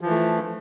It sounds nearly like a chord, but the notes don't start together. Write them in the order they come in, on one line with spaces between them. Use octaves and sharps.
F3 E3 A3